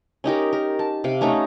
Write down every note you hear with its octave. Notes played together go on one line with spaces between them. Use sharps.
C#4 D#4 G4 A#4
A#4
A5
C3 F5 D6
A3 C#4 D#4 A#5